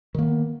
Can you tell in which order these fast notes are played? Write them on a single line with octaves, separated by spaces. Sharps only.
D#3 A#3 B3